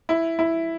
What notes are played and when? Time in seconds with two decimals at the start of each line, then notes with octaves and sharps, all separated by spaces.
0.09 E4
0.39 E4